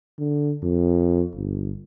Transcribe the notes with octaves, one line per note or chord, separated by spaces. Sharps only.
D3
F2
G1